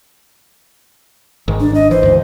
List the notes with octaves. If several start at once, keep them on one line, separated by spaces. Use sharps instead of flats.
G#1 G#2 D#3
D4
D#5
E3 C5
D2 G#2